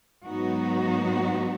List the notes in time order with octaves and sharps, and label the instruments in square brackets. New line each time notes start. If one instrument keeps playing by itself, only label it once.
[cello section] G#2 F#3 B3 D#4 F#4